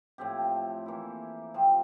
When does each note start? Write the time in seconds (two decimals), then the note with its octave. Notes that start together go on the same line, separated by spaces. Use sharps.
0.18 A2 F3 C4 G4
0.86 E3 A#3 E4
1.54 C3 F3 C4